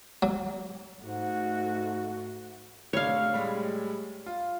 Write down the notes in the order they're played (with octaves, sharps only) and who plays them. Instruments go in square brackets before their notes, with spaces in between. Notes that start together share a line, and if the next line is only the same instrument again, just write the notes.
[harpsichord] F#3
[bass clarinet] G#2 [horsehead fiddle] A3 F#4
[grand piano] A2 C3 D4 [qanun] C#5 F5
[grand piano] A2 G3 G#3
F4